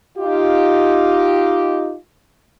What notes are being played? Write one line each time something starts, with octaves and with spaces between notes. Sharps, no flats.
D#4 F4 G4